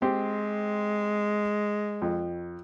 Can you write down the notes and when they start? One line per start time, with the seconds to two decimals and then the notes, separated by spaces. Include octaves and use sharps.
0.02 G#3 C4 G4
2.02 F2